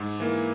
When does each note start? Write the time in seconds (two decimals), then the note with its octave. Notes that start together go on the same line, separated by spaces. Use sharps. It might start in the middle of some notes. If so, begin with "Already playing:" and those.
Already playing: G#2
0.20 E3 A#3